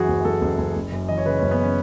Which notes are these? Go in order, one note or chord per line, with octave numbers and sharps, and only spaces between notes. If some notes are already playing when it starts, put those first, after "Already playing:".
Already playing: F#2 E3 F#4 G#4
F#1
F#1 A4
F#1
F#1
F#1
F#2
E3 D#5
C#5
C#3 B4
C#4
F#1
B3
C#4